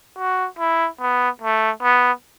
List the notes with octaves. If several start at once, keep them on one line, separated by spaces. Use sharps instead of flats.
F#4
E4
B3
A3
B3